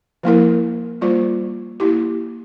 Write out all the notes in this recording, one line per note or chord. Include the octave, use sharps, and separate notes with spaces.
F3 A#3 E4 A#4
G3 A#3 F4 C5
A#3 E4 G4